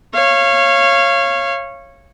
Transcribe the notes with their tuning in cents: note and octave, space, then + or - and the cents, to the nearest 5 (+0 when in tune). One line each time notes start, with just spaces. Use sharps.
C#5 -15 F5 -25